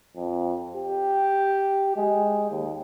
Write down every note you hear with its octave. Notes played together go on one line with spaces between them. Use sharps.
F2
G4
G#3
D#2